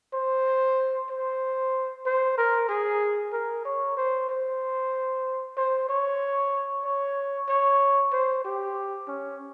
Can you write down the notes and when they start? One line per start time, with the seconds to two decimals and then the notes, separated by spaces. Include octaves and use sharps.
0.14 C5
1.10 C5
2.06 C5
2.38 A#4
2.69 G#4
3.33 A#4
3.65 C#5
3.97 C5
4.29 C5
5.57 C5
5.89 C#5
6.85 C#5
7.49 C#5
8.12 C5
8.45 G4
9.08 C#4